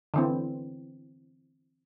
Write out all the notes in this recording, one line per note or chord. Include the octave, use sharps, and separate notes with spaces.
D3 E3 C4